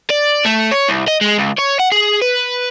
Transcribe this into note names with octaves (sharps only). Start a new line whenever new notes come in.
D5
A3
C#5
C2
D#5
G#3
C#2
C#5
F#5
G#4
B4